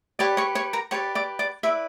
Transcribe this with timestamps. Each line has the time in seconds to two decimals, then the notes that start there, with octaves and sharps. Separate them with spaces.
0.19 G4 B4 C#5 D5 C#6
0.37 C#5 C#6
0.55 C#5 C#6
0.73 A#4 A#5
0.91 G4 B4 C#5 D5 C#6
1.15 D5 D6
1.39 D5 D6
1.63 E4 B4 D5 E5